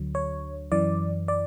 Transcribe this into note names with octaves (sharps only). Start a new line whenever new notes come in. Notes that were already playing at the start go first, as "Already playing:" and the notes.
Already playing: D2 D3 F#3
C#5
F#2 E3 D5
D5